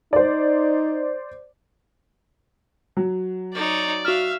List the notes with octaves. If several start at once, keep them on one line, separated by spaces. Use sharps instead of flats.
D#4 C5 D5
F#3
D#4 C#5 D5
F#4 E5 F5 F6